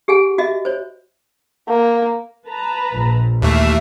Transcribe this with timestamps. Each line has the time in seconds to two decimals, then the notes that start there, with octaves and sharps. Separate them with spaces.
0.08 G4 G#4 F#5 G#5
0.38 F#4 D#5 E5
0.65 C5 C#5
1.68 A#3
2.48 B4 A5 A#5
2.93 A#1
3.42 D#2 E3 A3 E5 F5